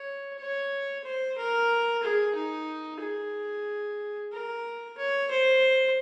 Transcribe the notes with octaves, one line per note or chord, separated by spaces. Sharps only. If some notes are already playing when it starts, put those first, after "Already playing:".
Already playing: C#5
C#5
C5
A#4
G#4
D#4
G#4
A#4
C#5
C5